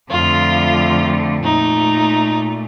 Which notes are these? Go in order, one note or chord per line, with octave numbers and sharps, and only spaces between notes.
F2 D3 A3 F4
A#2 A3 D#4